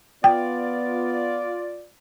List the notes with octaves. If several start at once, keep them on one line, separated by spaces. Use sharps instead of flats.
B3 F4 D5 G5